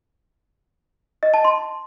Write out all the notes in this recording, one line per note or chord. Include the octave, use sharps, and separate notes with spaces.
D#5
A5
C6